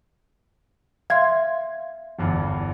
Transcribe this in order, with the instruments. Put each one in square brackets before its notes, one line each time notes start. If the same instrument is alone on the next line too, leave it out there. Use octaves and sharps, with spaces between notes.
[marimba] E5 C6 [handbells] F5 G#6
[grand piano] G1 E2 G2